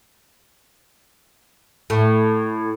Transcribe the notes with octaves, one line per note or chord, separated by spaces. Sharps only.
A2